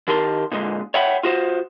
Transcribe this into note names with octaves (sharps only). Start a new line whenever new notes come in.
D#3 G4 A#4 A5 C6
A#2 D3 G#3
C#5 E5 F#5 G5 B5
F4 F#4 C5